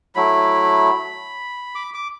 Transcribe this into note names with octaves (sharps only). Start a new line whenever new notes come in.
F#3 A3 E4 B5
D6
D6